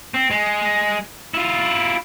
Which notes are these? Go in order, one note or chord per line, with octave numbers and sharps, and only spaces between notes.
C4
G#3
E4 F4